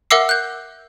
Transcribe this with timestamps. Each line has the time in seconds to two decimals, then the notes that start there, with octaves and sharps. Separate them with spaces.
0.11 A#4 E5 F#5 D6 E6 C7
0.29 F#6 G6